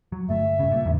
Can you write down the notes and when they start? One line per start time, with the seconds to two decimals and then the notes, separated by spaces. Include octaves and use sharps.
0.12 F#3
0.29 G1 A3 E5
0.59 G2 C#3
0.72 A#2
0.85 E2 G#2 C#3